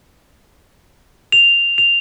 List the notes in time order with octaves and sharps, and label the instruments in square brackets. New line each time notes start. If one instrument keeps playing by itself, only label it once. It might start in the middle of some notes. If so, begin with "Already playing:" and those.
[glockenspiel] F7
F7